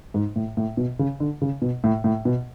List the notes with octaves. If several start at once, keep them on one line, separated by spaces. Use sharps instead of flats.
G#2
A2
A2
B2
C#3
D3
C#3
B2
A2
A2
B2